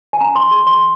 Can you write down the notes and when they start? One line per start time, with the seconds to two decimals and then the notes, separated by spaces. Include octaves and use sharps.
0.13 G#5
0.21 C#4 A#5
0.36 C6
0.51 G#4 C6
0.67 C6